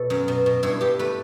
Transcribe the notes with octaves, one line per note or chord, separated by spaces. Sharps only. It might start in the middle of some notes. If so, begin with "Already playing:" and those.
Already playing: B2 A4
F#2
B2
B2
G2 E4
G2 G4
A3 B4